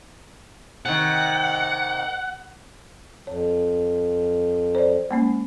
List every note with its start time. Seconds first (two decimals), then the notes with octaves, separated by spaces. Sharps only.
0.86 C3 D#3 F#5
3.27 F2 C#5
4.75 C5 D5
5.11 G#3 A#3 C#4